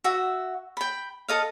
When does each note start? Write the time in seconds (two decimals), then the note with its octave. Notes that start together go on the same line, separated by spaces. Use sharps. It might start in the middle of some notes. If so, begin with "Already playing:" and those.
0.04 F#4 E5
0.77 G5 B5
1.28 A4 D#5 F5